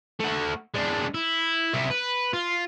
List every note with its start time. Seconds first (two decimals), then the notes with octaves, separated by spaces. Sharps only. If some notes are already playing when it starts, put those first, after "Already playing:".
0.20 A3 F#5
0.74 G#3 D4
1.14 E4
1.74 C3 E4
1.90 B4
2.33 F4